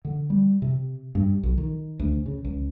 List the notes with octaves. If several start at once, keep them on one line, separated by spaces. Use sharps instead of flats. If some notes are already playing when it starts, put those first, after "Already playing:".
D3
G3
C3
G2
B1
D#3
D2
C#3
C#2